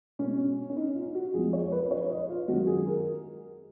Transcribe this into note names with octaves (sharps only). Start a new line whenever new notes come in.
B2 G#3 C#4
C#4
D#4
F4
F#4
F2 F3 G#3 G#4
C#5
B4
B4
C#5
D#5
F4
F#2 D#3 G#3 F#4
G#4
A#4